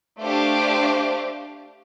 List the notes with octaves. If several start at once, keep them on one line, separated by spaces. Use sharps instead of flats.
A3 D4 G4 C5 F5